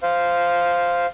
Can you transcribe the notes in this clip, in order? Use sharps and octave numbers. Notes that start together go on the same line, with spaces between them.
C5 F5